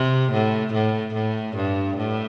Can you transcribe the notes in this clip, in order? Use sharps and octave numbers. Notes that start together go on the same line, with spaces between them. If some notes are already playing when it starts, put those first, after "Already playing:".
Already playing: C3
A2
A2
A2
G2
A2